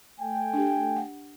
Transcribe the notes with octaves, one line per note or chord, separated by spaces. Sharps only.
A3 G5 G#5
D4 G4
F#5